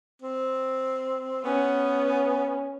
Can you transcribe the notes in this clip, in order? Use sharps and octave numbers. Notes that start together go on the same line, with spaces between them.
C4
B3 C#4